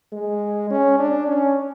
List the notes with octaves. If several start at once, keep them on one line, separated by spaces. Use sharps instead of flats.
G#3
C#4
D4
C#4